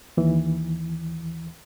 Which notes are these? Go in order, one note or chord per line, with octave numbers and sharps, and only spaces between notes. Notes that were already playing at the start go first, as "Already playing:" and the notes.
D#2 E3